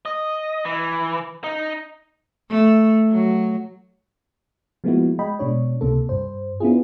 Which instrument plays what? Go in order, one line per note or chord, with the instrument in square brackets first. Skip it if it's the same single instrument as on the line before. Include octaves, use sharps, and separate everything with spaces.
[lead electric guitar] D#5
E3
D#4
[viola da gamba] A3
F#3
[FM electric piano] F3 G#3 A#3 B3 E4 F#4
G#3 D#5 G5 B5
B2 G#3 D4 C#5
C#2 C3 A#3 A4
G2 C5
B3 C4 D4 E4 F4 G#4